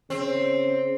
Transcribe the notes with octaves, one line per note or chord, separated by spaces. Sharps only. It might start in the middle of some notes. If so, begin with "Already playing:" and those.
C#3 C4